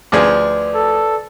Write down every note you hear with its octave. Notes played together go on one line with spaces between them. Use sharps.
D2 F3 G#4 B4 D5 D6
A4